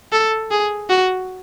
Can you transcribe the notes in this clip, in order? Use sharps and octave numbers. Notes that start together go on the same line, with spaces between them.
A4
G#4
F#4